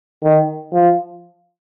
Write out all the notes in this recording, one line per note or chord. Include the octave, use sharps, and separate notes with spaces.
D#3
F3